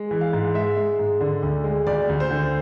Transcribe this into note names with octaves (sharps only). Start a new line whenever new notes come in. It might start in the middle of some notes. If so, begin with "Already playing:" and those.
Already playing: G#3
E3
F5
G#2
G#3 E5
G#3
G#2
D3
D2
G#3
D2 D5
D2
C5
D3